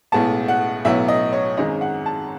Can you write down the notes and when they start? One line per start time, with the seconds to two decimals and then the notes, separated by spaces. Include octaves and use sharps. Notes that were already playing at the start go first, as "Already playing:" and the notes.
0.12 B1 A2 G#3 B3 A5
0.48 F#5
0.85 B1 A2 F#3 B3 E5
1.08 D#5
1.33 C#5
1.57 G#1 F#2 D#3 G#3 D#5
1.81 F#5
2.06 A5